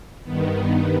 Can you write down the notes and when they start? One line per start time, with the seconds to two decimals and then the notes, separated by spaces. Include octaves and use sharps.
0.23 G2 D#3 B3